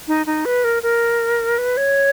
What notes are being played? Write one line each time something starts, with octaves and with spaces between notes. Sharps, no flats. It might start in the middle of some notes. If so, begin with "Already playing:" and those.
D#4
D#4
B4
A#4
A#4
B4
C#5